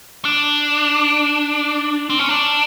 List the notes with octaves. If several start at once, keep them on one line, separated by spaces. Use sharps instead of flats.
D4
C4
C#4
D4